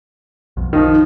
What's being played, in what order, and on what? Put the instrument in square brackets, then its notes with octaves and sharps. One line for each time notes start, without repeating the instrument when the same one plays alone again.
[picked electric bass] B1 F2
[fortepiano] D#3 F3 [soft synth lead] D#4